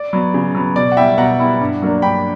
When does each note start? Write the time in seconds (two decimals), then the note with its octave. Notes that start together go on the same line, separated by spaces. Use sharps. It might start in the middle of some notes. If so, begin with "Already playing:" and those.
Already playing: D5
0.13 F#3 B3
0.34 C#3
0.55 F#3 B3
0.76 B2 D5
0.92 F#5
0.96 G3 B3 E4 E5 G5
1.18 B2 F#5 A#5
1.39 G3 B3 E4
1.61 G2
1.82 F#3 A#3 D4
2.02 G2 G5 B5